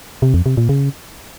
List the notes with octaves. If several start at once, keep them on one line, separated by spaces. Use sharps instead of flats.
C3
F2
C3
A#2
C#3